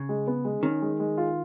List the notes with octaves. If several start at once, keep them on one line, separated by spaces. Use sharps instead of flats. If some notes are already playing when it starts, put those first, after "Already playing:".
Already playing: C#3
G#3
B3
G#3
D#3 C#4
G#3
G#3
F4